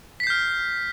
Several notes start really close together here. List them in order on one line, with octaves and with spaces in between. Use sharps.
B6 C7 G6 F6